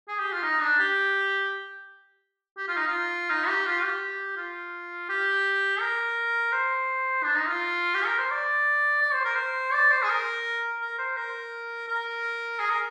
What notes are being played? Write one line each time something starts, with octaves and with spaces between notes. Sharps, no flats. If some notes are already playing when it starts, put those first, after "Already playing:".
G#4
G4
F4
D#4
D4
G4
G4
F4
D#4
F4
D#4
G4
F4
G4
F4
G4
A#4
C5
D4
D#4
F4
G4
A#4
C5
D5
D5
C5
A#4
C5
D5
C5
G#4
A#4
A#4
C5
A#4
A#4
G#4
A#4